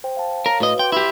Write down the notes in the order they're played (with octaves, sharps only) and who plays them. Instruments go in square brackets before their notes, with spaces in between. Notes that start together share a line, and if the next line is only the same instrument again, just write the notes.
[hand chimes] C5 G5
F5 A5
[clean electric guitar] A#4 [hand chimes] C#5 F5
[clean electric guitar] A2 D#5 [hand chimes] F#4 B4
[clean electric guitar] G5 [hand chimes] C6 D6
[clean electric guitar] E4 G4